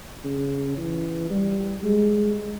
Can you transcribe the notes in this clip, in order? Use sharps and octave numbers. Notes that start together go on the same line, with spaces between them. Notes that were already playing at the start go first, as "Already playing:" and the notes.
C#3
E3
G3
G#3